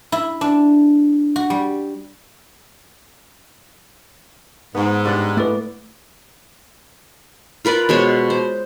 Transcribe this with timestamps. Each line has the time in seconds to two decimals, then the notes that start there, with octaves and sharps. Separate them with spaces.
0.12 E4
0.41 D4
1.36 F#4
1.50 G3
4.75 G#2 B3
5.05 G2 D5 F#5
5.37 A2 A3 B4 D5
7.65 F4 A#4 B4 D5
7.89 B2 G#3 C5 C#5
8.30 C5